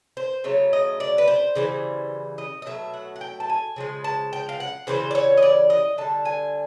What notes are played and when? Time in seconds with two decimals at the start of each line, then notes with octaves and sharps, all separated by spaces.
0.17 C5
0.44 C#3 F#3 A3 C#5
0.73 D#5
1.00 D5
1.18 B4
1.28 C5
1.56 C#3 E3 G3
2.38 D#5
2.62 D#5
2.66 B2 F#3 A3 E5
2.94 F#5
3.16 F#5
3.21 G5
3.40 A5
3.49 G#5
3.76 C#3 F3 G#3
4.04 A5
4.33 G5
4.49 F5
4.60 F#5
4.87 C#3 E3 G3 C5
5.11 D5
5.15 C#5
5.37 D#5
5.43 D5
5.70 D#5
5.98 D3 G3 A5
6.25 G#5